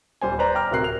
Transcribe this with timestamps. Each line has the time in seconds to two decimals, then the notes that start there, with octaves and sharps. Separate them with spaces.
0.21 D#1 G3 C5 G#5
0.39 B4 C5 D5 A#5
0.55 G5 A#5 D6 F6
0.71 D1 C3 A#4 F#6 C7
0.84 F7